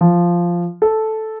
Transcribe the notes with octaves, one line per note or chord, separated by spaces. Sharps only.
F3
A4